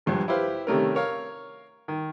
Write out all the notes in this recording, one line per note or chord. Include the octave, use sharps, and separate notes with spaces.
A#1 G2 G#3
E4 G4 B4 C5 F5
C3 D#3 G3 A3 C#4 A#4
A#4 C#5 F5
D#3